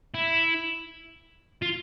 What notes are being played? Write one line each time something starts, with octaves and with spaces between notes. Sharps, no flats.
E4
F4